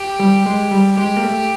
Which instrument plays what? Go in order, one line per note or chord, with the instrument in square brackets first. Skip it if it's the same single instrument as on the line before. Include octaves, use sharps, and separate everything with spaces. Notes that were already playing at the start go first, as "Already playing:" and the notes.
Already playing: [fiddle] G4
[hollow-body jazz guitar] G3
G#3
G3
[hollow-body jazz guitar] G#3 [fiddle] G4
[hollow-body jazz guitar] A#3
A3